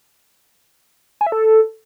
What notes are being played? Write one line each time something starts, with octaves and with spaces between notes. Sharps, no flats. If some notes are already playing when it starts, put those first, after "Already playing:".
G#5
E5
A4